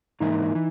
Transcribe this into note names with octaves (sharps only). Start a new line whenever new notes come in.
G#2 E3 A#3 D#4 E4
E3